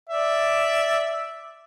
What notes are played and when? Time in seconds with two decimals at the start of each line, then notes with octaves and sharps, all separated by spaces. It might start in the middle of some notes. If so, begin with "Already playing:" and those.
0.09 D5 E5